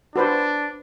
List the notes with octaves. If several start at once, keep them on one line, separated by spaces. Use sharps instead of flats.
D4 F#4 B4 C5